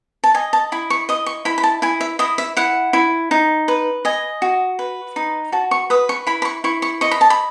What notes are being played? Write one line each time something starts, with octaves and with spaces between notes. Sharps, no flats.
A5
D#5 G#5
A5
E4 B5
C#6
D#5 D#6
C#6
E4 B5
B5
A5
E4 G#5
E5
E4 D#5
E5
E4 F#5
E4
D#4
B4
D#5 G#5
F#4
B4
D#4
F#4 A5
C#6
B4 D#6
C#6
E4 B5
B5
C#6
E4 C#6
C#6
D#5 C#6
B5
A5
B5